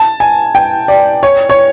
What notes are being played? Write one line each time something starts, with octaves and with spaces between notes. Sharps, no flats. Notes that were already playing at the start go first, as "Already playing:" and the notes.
Already playing: A5
G#5
G5
D5
C#5
C#5